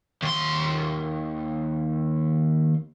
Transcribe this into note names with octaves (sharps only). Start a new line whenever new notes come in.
D#2 C6